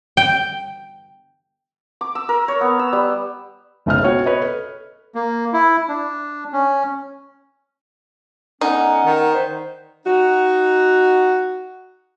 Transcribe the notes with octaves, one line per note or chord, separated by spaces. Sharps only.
G5
D6
E6
A#4
C#5
B3
E6
G3
F#1 B1 E5 F6
B3 F#4 C#5 G5
B4 C#5 D#5
A4
A#3
E4
D4
C#4
D3 B3 C#4 D#4 F#5
D#3
D4 B4 C5
D#4 F#4